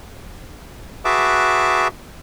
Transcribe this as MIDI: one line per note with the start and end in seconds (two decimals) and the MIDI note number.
1.05 1.88 66
1.05 1.88 68
1.05 1.88 71
1.05 1.88 76
1.05 1.88 81
1.05 1.88 86